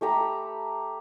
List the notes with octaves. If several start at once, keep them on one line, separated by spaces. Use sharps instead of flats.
A3 G4 A#5 B5